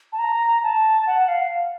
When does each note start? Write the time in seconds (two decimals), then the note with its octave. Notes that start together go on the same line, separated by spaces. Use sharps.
0.13 A5
0.19 A#5
0.63 A5
1.07 F#5
1.28 F5